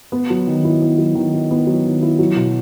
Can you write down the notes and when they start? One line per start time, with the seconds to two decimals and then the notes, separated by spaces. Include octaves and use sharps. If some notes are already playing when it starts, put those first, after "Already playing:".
0.12 B3
0.30 F#3
0.47 D#3
0.64 E4
0.82 B3
0.98 F#3
1.15 D#3
1.33 E4
1.51 B3
1.67 F#3
1.85 D#3
2.02 E4
2.19 F#3
2.36 B2